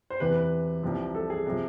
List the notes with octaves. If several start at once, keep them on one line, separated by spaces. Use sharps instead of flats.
C5
E2 C3 E3 B4
B4
C2 C3 F3
A4
G#4
C3 F3